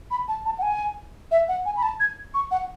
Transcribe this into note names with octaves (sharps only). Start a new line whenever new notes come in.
B5
A5
A5
F#5
G#5
E5
F#5
G#5
B5
A5
G#6
C#6
F#5